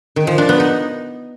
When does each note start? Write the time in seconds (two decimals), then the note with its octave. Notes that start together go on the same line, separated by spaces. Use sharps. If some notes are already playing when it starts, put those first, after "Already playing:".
0.16 D#3
0.27 F3
0.38 D4
0.49 B3
0.60 D#4